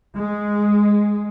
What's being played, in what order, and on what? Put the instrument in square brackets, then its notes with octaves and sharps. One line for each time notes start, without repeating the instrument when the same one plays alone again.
[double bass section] G#3